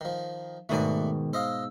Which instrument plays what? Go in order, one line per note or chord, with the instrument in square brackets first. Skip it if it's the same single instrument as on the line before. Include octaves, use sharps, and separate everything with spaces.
[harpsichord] D#3 F3
[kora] G#2 B2 F#4 [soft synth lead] D#3 [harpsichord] A3 D4 D5
[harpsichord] C5 D#5 F5 [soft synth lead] E6